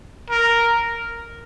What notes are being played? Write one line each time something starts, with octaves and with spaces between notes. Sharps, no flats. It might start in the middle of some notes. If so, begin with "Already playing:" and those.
A#4